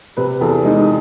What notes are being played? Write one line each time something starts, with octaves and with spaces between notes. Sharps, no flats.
C3 B4
E2 A4
G#3 D#4